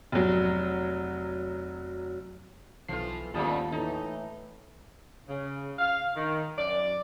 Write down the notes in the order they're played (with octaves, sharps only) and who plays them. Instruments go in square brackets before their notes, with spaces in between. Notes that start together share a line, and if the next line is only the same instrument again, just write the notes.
[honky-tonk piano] F1 F#3
[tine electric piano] B1 C7 [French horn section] E3 B3 A4 [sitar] F3 F4
[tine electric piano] D#2 A5 D#6 [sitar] G#2 G3 [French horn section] B3 C#4 [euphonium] F4
[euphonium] A2 [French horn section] E3 A3 [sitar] D#4
[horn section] C#3
F5
D#3
F#2 D5